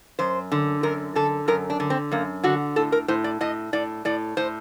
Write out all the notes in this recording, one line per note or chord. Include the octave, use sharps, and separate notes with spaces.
F#2 C5
D3
F#2 A#4
D3 A4
F#2 A#4
D4
D3
C4
F#2 A#3
D3 F#4
A2 A4
A#4
A2 C5
D5
A2 D#5
A2 D5
A2 D5
A2 C5